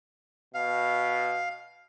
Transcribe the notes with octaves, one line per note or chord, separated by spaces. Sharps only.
B2 F5